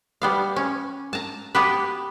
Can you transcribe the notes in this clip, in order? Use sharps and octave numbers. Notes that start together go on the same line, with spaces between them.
G3 B3 F5
C#4
A5 A#5
B3 G4 B4